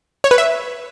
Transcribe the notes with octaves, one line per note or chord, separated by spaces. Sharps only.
C#5
B4
E5